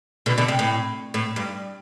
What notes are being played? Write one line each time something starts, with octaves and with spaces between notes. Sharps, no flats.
B2 D3
B2 D3
C3
A2
A2
G2